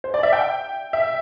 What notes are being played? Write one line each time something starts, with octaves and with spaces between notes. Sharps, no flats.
C5
D5
E5
G5
E5